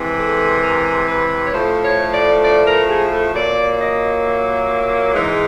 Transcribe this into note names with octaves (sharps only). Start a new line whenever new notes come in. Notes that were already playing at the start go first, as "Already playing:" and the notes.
Already playing: C3 E3 G#3
A4
A#4
B4
C#5
A2 F3 A3 C5
C#5
D5
D5
A#4
G#4
A4
A#2 F#3 A#3 D5
D#5
E5
G#2 E3 G#3